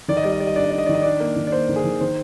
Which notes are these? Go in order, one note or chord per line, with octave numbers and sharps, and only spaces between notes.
D#3 D5
D#5
G3 D5
D#5
G3 D5
D#5
D4 D5
D#5
D4 D5
D#5
D#3 D5
D#5
D4 D5
A#3
D#3
D5
A#3 C5
D#3
G#4
D#3
D#3 C5